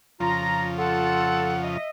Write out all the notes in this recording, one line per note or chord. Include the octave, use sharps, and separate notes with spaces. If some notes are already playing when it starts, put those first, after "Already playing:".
F2 C#3 F3 F4 A#5
F4 A4 F#5
D#5 E5